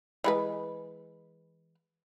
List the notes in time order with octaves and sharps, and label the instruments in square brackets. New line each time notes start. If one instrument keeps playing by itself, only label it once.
[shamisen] E3 G#3 B4